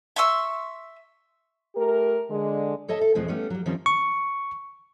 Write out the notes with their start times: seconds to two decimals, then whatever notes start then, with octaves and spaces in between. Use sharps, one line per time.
0.16 E5 C6 C#6 E6
1.76 A3 G4 A#4
2.29 D3 G#3
2.88 A4 C#5 D#5 E5 A5
3.01 A4
3.15 E2 B2 F3 G#3 A3 C4
3.28 G3 A3 B3 C#4
3.50 F#3 G3
3.65 F#2 D#3 F3 G3 C4 C#4
3.86 C#6